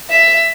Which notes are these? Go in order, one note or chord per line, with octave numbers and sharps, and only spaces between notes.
E5